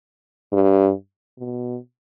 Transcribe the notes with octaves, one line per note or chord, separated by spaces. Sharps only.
G2
B2